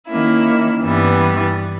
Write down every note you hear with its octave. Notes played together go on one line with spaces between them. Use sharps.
D#3 A#3 C#4 E4
G2 E3 G3 B3